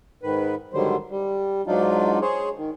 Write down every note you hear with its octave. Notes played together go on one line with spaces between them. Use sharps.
G#2 D#3 B4
G#2 D3 D#3 F#3 G3 C5
G3
G#2 F#3 D4 D#4 F4
G#4 C5 C#5
D#3